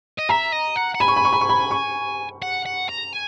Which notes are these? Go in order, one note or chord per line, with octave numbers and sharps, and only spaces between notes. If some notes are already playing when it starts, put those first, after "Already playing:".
D#5
E5 A#5
D#5
F#5
F#5
G#5 B5
C#6
B5
C#6
B5
C#6
B5
C#6
F#5
F#5
A#5
G#5